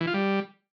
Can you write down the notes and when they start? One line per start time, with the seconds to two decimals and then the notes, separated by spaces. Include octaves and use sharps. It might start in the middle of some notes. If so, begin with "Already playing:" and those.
0.01 E3
0.07 F4
0.14 G3